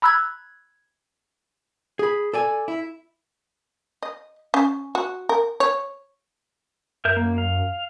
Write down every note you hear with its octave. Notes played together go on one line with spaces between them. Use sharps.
A#5 B5 E6 F#6 G#6
G#4 B5
A4 D5 G#5
E4
D#5
C#4
F#4
A#4
C#5
F#2 A#4 E5 G6
A#3
F5